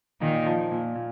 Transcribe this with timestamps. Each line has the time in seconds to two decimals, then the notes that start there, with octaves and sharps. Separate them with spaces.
0.21 A#2 D#3
0.46 F3
0.71 A#2
0.95 A#2